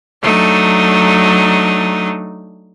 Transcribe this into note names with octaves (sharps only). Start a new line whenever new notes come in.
F#3 A3 D4 D#4